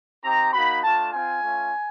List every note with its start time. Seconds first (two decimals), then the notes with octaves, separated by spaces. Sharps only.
0.24 C4 D#4 G4 A#5
0.53 A#3 D#4 F#4 B5
0.84 A3 D4 F4 A5
1.13 C4 F4 G#5
1.42 A3 C#4 F4